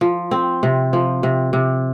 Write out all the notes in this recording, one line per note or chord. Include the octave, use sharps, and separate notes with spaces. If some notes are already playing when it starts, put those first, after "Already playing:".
F3
C4
C3
F3
C3
C3